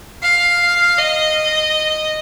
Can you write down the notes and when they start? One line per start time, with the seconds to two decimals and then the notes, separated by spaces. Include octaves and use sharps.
0.23 F5
0.98 D#5